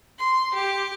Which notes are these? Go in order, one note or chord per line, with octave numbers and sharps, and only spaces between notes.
C6
G4